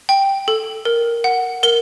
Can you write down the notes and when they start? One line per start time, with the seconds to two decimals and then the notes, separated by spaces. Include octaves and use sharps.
0.09 G5
0.48 A4
0.85 A#4
1.24 F#5
1.63 A#4 G7